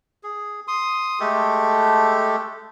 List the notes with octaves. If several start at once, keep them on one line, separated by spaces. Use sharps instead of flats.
G#4
C6 D#6
G#3 A3 G4 A4